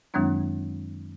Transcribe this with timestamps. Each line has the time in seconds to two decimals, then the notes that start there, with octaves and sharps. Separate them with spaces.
0.14 F#2 D#3 F#3 G#3 C4 D4